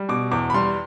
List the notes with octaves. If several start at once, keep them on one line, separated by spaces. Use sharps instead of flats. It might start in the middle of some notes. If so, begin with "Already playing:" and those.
Already playing: G3
B2 D6
E2 D6
B5
G3 C6